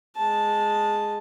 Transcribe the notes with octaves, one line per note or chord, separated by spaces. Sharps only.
G#3 A5